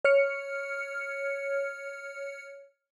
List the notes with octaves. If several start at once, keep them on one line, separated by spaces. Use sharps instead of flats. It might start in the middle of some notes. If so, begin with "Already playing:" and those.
C#5 F6 C#7